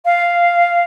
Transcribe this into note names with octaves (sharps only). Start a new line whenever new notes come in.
F5